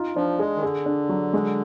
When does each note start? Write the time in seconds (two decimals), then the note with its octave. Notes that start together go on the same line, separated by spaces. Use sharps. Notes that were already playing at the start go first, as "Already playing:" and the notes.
Already playing: D#4 F4
0.16 F3 D4
0.39 G#3 G#4
0.56 D#3
0.63 D3 G#4
0.86 D4
1.09 F#3
1.33 G#3